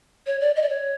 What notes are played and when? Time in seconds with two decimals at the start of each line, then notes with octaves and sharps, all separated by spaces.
0.27 C#5
0.41 D5
0.56 D#5
0.62 D5
0.69 C#5